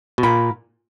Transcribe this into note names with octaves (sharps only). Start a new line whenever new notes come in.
B2
A#2 A#4 F5 B5